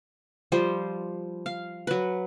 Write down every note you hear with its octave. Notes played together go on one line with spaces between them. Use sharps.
F3 G3 C5
F5
F#3 B4